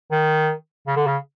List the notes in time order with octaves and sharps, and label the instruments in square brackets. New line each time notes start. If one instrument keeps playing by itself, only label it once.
[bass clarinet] D#3
C#3
D3
C#3